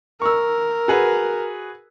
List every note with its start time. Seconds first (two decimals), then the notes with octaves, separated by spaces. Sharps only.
0.22 A#4 C#6 E6
0.88 F#4 G#4 B4